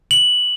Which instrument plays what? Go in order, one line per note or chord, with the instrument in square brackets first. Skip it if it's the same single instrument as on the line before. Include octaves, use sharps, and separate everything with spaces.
[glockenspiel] F#7